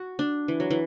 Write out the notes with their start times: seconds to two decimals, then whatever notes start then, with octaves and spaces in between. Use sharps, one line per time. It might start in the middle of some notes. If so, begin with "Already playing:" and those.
Already playing: F#4
0.19 D4
0.48 E3
0.60 F#3
0.71 E3